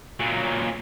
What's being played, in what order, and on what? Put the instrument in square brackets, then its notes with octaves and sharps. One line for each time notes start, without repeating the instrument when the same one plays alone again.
[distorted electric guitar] A#2 F#3